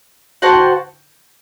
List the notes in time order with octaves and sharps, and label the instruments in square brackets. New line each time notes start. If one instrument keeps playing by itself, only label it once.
[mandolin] F#4 C5 F#5 A5
[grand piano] G5